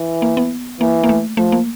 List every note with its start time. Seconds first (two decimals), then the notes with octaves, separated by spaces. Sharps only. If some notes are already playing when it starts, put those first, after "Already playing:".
Already playing: E3
0.22 A#3
0.37 B3
0.80 E3 A#3
1.04 A#3
1.09 A3
1.37 F3 A3
1.52 A#3